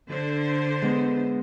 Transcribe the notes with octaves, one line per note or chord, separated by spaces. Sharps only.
D3 C5
G#3 B3